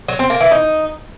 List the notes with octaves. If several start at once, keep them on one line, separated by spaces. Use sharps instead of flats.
F#3
C4
A#3
E3
D#4